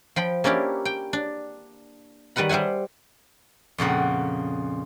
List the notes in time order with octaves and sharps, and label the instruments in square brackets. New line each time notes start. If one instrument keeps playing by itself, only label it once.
[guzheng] F3 G5 B5
A#3 C#4 D4 E4 G4
G5
D4
D#3 G3 B4 F#5 B5
G3 C5 E5 F#5 G#5
F2 A#2 C#3 F#5